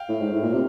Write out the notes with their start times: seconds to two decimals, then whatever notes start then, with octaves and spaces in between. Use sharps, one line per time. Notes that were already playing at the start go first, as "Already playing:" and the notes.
Already playing: F5 G5
0.09 A2
0.21 G#2
0.32 A2
0.43 A#2
0.53 C3